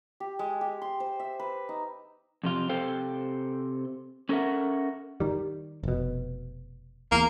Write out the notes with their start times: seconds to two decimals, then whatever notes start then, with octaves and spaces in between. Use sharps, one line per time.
0.20 G4
0.39 G#3
0.61 G4
0.82 C6
1.00 C5
1.19 E5
1.40 B4
1.69 D#4
2.44 F2 C3 F4
2.69 C3 A4 C5 F5 G5
4.29 C#4 A4 A#4 C#5 E5 F#5
5.20 D#3 G3
5.83 F1 B2
7.12 E2 A#3